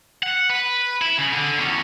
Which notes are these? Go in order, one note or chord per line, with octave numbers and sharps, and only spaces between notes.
F#5
B4
E4
C#3
D3
E2 C#4